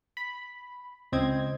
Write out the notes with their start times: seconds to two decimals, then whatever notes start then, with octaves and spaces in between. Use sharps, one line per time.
0.17 B5
1.12 C#2 C4 D#5 G#6